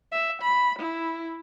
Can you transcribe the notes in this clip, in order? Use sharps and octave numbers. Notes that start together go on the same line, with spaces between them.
E5
B5
E4